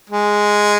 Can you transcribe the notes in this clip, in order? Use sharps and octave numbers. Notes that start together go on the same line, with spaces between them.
G#3